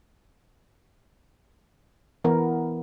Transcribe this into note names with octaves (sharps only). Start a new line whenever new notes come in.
E3 B3 A#4